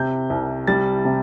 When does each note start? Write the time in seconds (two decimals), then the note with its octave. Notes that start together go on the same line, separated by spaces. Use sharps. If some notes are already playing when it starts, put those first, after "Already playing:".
Already playing: C3 G6
0.30 C2
0.67 G3 A6
1.05 C3